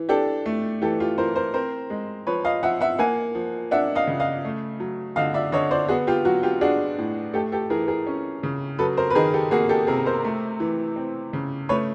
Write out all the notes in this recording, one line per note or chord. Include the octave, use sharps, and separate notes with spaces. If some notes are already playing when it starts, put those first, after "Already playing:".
Already playing: E3
D4 G4 A4
A3
E3 G4 A4
F4 G4
E3 A#4 C5
A#4 C5
C4 A#4 C5
G#3
F3 B4 C#5
D#5 F5
F3 E5 F#5
E5 F#5
A#3 F#5 G#5
F3
D4 E5 F#5
D#5 F5
C#3
D#5 F5
A3
F#3
D3 D#5 F5
D5 E5
D3 C#5 D#5
C5 D5
B3 F#4 G#4
F4 G4
F#3 F#4
F4 G4
D4 F#4 G#4
A2
A3 G4 A4
G4 A4
E3 G#4 A#4
G#4 A#4
C#4
C#3
F#3 A4 B4
A#4 C5
B4
D#3 G#4 A#4
G4 A4
A#3 F#4 G#4
G4 A4
C3 G#4 A#4
A#4 C5
A3
E3
C4
C#3
A3 B4 C#5